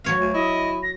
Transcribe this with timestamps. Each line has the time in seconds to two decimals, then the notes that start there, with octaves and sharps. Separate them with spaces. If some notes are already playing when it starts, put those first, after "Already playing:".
0.04 F#3 C#5 F5
0.19 D2
0.34 E4 D#5
0.83 A#6